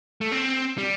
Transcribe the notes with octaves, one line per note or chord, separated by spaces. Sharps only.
A3
C4
G3